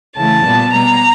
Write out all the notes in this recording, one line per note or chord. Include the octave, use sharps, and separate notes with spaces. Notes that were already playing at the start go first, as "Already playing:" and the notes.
C#3 E3 A3 A5
A#2 G3 B3
B2 G3 B3 A#5